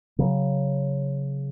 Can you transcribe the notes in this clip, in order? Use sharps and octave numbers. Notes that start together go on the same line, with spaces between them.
C#3 F#3